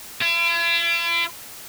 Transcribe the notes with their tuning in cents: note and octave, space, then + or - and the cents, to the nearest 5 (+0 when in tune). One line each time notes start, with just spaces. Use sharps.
E4 +45